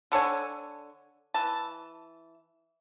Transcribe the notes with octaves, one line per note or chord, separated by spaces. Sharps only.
D3 A4 C#5 G#5
E3 A5